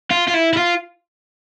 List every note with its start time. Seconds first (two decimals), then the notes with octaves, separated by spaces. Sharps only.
0.11 F4
0.28 F4
0.34 E4
0.53 E4
0.57 F4